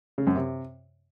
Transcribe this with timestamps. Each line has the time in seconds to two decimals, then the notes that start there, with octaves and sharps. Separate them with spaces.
0.18 C#3
0.27 F#2
0.36 C3